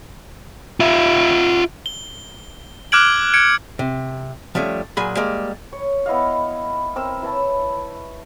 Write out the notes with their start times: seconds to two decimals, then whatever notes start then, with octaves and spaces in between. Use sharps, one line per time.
0.80 F4 E5
1.86 G7
2.92 D6 F6 F#6 G#6 D7 F#7
3.34 G#6 C#7 D7
3.79 C3
4.55 F3 G3 A3 C#4
4.97 A#2 F#3 G#4 G#5 B5
5.16 G3 G#3 A#3
5.73 C#5
6.06 B3 E4 D#5 F5
6.96 C4 A#4 E6
7.22 E4 B4 C#5 A5